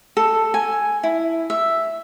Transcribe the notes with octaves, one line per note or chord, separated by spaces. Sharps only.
A4
G#5
E4
E5